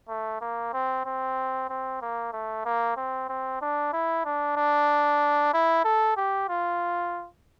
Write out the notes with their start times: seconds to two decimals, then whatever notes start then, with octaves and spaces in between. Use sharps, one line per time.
0.09 A3
0.41 A#3
0.73 C4
1.05 C4
1.69 C4
2.01 A#3
2.33 A3
2.65 A#3
2.97 C4
3.29 C4
3.62 D4
3.93 E4
4.25 D4
4.57 D4
5.54 E4
5.85 A4
6.17 G4
6.49 F4